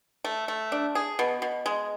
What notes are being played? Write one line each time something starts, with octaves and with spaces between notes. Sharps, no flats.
A3
A3
D4
G#4
B2
B2
G#3